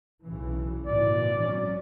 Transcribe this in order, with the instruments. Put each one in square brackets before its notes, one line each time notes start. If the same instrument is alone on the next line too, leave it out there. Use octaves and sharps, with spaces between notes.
[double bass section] B1 C#3 E3
[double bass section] G#1 A#2 E3 [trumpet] D5
[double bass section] F#3 C#4